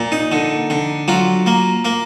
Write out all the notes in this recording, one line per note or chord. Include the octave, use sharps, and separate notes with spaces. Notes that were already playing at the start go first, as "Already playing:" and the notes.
Already playing: A#2
D#4
D3
D3
F#3 F4
A#3
A#3